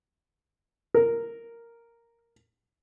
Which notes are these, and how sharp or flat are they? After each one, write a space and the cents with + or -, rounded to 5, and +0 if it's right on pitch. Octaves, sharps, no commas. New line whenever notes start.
A#4 -5